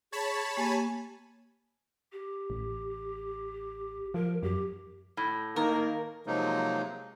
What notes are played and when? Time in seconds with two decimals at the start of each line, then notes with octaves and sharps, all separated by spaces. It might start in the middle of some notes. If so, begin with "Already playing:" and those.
0.12 G#4 C#5 A5 B5
0.57 A#3 G4 G#5
2.12 G4
2.50 A1
4.14 F3 A#4
4.43 F#2 G4
5.17 A2
5.56 D#3 A#3 A#4
6.27 C3 F3 F#3 G#3 A#3 D#4